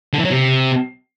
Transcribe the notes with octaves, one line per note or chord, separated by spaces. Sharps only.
D3
E3
F#3
C3